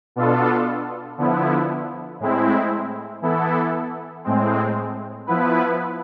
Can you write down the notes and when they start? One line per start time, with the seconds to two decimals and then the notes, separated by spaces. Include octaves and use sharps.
0.16 B2 B3 D4 F4 A4
1.18 D3 F3 B3 E4
2.20 A2 G#3 C4 E4
3.22 E3 B3 E4 A4
4.24 A2 G#3 C4
5.27 F3 B3 E4 B4